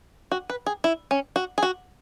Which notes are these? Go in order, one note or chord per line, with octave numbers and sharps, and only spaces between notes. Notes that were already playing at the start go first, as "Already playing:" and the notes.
F#4
B4
G#4
E4
C#4
F#4
G#4
F#4